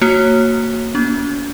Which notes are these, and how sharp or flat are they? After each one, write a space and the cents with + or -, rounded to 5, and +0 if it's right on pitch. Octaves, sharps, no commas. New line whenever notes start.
A#3 -20 F#4 +0 C#5 -15
B3 -45 D4 -45